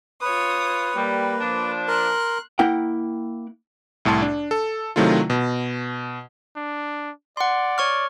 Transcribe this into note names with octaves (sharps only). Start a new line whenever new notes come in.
F4 B4 C#5 D#6
G3 A#3
F3 D4
A#4 C6 F#6
A#3 E4 A#4 F#5 G5
C2 A2 A3 A5 C6
D4
A4
C3 D#3 F#3 A3 E4 F4
B2
D4
D5 F#5 C6
C#5 C#6 F6